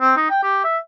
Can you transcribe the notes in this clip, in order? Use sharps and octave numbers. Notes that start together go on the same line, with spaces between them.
C4
D#4
G5
G4
E5